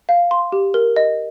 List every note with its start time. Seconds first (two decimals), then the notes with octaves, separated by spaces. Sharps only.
0.09 F5
0.31 C6
0.52 G4
0.74 A#4
0.96 D#5